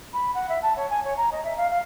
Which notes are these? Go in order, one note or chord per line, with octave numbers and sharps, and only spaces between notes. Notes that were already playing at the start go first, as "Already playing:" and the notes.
B5
F#5
E5
A5
C#5
G#5
C#5
A#5
D#5
E5
F5
F5